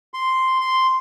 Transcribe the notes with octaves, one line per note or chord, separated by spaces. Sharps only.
C6
C6